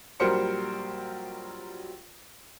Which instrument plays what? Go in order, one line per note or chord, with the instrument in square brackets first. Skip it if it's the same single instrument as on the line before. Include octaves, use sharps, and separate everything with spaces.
[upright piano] A#1 F#3 G3 A#4 C5 C#7